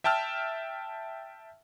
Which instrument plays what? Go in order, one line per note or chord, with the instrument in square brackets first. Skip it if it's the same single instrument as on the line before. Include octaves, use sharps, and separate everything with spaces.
[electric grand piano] E5 G5 A5 E6 F6